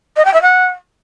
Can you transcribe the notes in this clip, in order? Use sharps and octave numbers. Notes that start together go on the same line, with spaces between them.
D#5
G5
E5
F#5